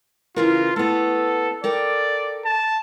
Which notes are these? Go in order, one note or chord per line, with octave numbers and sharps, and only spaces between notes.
C#3 E3 F4 A#4
A3 B3 A4
A4 A#4 D5 G5
A5